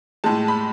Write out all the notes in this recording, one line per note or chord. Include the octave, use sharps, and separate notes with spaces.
A2 G#3 A5
B5